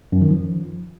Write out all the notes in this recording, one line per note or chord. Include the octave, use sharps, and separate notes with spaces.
F#2
D#3
F3